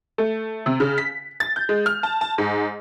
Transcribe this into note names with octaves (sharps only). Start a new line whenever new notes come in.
A3
C3
C#3
B6
A6
G6
G#3
F6
A5
A5
G#2